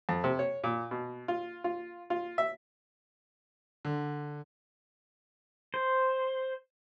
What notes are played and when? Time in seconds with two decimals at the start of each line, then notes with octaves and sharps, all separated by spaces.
0.09 F2
0.24 C3
0.39 C#5
0.64 A#2
0.91 B2
1.28 F4
1.64 F4
2.10 F4
2.38 E5
3.85 D3
5.74 C5